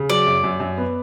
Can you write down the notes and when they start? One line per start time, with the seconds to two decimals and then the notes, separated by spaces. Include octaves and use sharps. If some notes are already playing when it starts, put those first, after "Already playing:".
Already playing: C#3
0.10 F#3 D5
0.27 F#2
0.44 F#2
0.60 F#2
0.78 B3